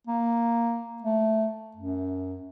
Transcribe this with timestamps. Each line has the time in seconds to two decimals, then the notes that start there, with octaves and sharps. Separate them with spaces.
0.07 A#3
1.02 A3
1.76 F#2